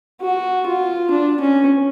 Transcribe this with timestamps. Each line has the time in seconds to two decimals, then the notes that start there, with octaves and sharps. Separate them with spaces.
0.21 F#4
0.66 F4
1.11 D4
1.41 C#4